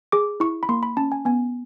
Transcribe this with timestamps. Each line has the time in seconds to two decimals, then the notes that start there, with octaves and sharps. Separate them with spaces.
0.12 G#4 D6
0.40 E4 C#6
0.63 B5
0.69 A#3 C6
0.83 B5
0.97 C#4 A5
1.12 G#5
1.25 B3 G#5